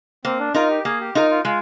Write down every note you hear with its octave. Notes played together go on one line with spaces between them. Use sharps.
A#3 C4
D4
D#4 F4 A#4
G4
A#3 G#4
G4
D#4 F4 A#4
F4
G#3 F4